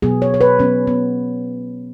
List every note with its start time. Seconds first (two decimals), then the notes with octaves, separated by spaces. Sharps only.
0.02 B2 F#3 B3 G#4
0.22 C#5
0.34 C#5
0.41 B4
0.59 B2 F#3 B3 C#4
0.87 B3